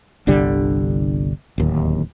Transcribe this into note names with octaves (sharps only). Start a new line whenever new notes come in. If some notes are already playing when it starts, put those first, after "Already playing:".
G1 C2 D3 G3
D1 D#2